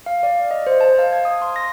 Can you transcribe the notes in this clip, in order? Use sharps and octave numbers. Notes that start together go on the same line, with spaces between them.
F5
D5
D#5
C5
A5
F5
G#6
D#6
C6
A#6